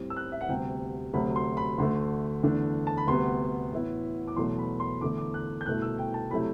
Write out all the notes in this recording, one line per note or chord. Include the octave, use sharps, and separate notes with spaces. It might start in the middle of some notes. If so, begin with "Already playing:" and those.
Already playing: A2 G3 C4
E6
F#6
E5
F#5
D2 C3 G3 B3 G5
D2 C3 F#3 A3 B5
C6
B5
D2 D3 A3 C6
E2 D3 A3 D4
A5
B5
D2 C3 G3 B3 C6
A2 E3 B3 E4
D6
E2 B2 F#3 A3 C6
B5
C6
E2 D3 A3 E4 D6
D6
F#6
G6
C2 B2 A3 E4 F#6
E6
G5
A5
C3 F#3 A3 E4 B5